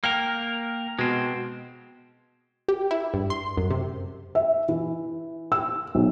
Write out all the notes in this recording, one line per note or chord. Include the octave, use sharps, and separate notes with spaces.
A#3 A#4 G5 F6
B2 G#3 C4
G4
E4
G2
C6
F#2
C3
E5
E3
E6
B1